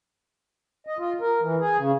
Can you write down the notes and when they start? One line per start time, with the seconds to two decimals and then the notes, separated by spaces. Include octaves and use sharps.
0.87 D#5
0.99 F4
1.21 A#4
1.42 E3
1.60 G#4
1.78 C#3